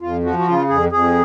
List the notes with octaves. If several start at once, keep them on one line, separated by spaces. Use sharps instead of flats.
F2 F4
F3 F#4
F#4
C#3 F4
F2 G#4
F2 G#4